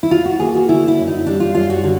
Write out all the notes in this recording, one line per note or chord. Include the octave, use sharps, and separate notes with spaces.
E4
F#3 F4
F#4
A#3 G#4
F#4
D3 E4
E4
F#2
D#4
G3 D4
F4
F#2 F4
F#4
D3